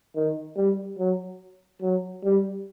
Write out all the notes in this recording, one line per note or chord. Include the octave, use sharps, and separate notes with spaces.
D#3
G3
F#3
F#3
G3